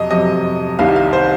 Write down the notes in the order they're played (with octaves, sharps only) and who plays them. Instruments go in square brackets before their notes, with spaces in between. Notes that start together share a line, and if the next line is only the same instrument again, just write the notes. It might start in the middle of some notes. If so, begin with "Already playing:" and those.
Already playing: [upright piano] F2 C3 F#3 D#5
F2 C3 F#3 D#5
C2 C3 D#3 F5
F5
C5